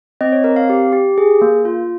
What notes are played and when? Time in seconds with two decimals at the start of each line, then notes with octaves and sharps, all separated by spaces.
0.21 C4 D#5
0.32 C#5
0.44 C4 A#4
0.56 F5
0.69 G4
0.93 G4
1.18 G#4
1.41 A#3
1.65 F4